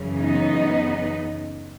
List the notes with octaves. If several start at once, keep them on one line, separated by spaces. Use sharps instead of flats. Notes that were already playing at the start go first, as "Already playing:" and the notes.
Already playing: F#2 C#3 E3
B3 D#4